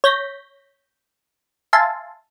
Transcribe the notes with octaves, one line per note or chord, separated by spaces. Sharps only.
C#5 G6 A#6 B6
E5 F5 G#5 A5 C6